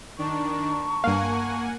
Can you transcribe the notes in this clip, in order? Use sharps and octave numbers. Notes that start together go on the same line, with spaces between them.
D#3 D4 A5 A#5 C#6
G2 A#3 F5 F#5 G#5